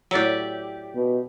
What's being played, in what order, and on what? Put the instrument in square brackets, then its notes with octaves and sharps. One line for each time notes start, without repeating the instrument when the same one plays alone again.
[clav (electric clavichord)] A2 F#3 [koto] G4 D5 E5
[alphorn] B2